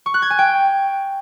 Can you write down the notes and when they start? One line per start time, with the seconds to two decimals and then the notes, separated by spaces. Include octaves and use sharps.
0.06 C#6
0.14 F#6
0.22 G#6
0.30 G#5
0.39 G5